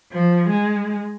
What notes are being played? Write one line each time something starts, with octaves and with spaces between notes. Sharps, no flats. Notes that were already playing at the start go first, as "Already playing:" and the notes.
F3
G#3